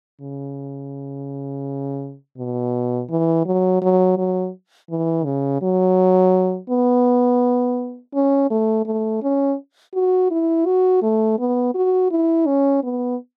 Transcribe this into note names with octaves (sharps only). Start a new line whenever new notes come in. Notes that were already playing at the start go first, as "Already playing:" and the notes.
C#3
B2
E3
F#3
F#3
F#3
E3
C#3
F#3
B3
C#4
A3
A3
C#4
F#4
E4
F#4
A3
B3
F#4
E4
C#4
B3